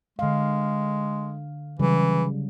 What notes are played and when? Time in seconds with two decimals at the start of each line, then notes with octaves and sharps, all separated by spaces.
0.19 D3 G#3 F5
1.79 C#3 E3 F#3 G3